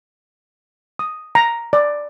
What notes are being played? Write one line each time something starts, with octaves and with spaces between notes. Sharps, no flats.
D#6
A#5
D5